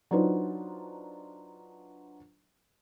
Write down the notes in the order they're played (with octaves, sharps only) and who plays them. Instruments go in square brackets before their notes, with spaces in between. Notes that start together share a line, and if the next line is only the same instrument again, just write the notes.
[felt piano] F#3 D4 D#4 F4 B4 C5